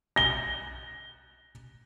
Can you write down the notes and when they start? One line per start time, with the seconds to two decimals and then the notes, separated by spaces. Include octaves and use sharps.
0.16 A#6 G7